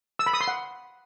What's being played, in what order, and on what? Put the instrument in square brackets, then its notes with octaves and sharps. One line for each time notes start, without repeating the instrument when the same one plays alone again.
[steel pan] E6
B5
D#6
C6
F#5